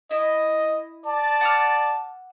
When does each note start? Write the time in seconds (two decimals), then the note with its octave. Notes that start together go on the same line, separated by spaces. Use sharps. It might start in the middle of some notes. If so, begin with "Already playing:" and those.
0.11 E4 D#5
1.06 D5 A5
1.41 F#5 D6 F6